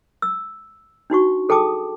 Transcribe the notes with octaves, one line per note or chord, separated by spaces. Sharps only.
E6
D4 D#4 F#4 C#6
G#4 A4 G5 A5 D6 D#6